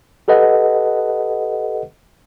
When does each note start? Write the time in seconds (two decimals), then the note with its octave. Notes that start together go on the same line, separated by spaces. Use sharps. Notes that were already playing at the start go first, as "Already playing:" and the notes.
0.28 G4 A4 B4 D#5 F#5